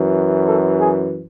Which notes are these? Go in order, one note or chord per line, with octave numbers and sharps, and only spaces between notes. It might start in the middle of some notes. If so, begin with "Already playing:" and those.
Already playing: F#2 E3
A4
G#4